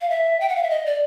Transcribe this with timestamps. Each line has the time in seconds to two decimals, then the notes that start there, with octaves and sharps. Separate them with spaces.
0.01 F5
0.10 E5
0.40 G5
0.49 F#5
0.56 F5
0.63 E5
0.70 D#5
0.86 D5